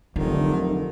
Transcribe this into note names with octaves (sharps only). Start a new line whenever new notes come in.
F1 D3 D#3 F#3